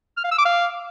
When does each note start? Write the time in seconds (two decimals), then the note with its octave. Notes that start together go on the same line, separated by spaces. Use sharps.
0.17 F6
0.24 F5
0.31 E6
0.38 D6
0.45 F5